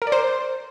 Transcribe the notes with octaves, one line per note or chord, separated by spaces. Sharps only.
A#4
D5
C5